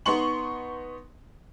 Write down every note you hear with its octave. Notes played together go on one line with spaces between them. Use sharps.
B3 D#4 C6 C#6 F#7